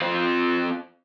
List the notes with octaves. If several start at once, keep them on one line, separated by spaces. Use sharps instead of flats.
C4 F4